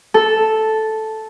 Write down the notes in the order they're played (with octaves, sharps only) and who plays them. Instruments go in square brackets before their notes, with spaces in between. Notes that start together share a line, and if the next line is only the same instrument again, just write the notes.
[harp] A4